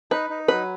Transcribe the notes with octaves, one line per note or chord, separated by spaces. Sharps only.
D#4 B4
D#4
F#3 B4